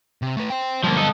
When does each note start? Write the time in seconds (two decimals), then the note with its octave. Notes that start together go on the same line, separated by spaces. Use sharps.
0.22 C3
0.36 A3 B4
0.50 C5 G5
0.84 D3 F3 G3 A#3
0.97 A4 D#5